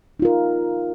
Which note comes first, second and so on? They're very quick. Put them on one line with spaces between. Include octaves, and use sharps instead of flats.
D#4 F4 A#4